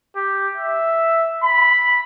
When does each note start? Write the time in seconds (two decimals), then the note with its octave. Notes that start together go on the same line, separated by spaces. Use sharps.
0.16 G4
0.57 E5
1.44 B5